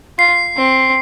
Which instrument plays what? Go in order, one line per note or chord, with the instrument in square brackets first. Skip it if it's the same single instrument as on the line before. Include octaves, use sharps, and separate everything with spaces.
[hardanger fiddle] F4 [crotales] C7
[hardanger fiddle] C4